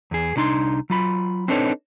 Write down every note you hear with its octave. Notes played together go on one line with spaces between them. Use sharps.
E2 G#4
C2 D4 D#4 B5 C6
F#3 F4 B5
C4 D4 D#4 A4 B4 C#5